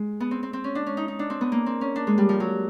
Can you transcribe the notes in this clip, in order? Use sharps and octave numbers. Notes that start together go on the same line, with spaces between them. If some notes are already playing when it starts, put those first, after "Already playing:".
Already playing: G#3
B3
C4
C4
C4
C#4
D4
C#4
D#4
D#4
D4
C4
B3
A#3
C4
C#4
D4
G#3
G3
F3
F#3